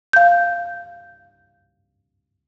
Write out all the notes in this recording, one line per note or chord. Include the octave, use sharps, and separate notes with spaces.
F5 G6